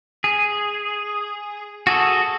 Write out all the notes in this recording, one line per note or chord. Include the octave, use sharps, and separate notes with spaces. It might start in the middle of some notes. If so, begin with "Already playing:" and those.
G#4
F#4 G#4 A4